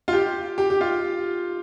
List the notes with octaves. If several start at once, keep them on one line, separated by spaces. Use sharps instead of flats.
F4
G4
G4
G4
F4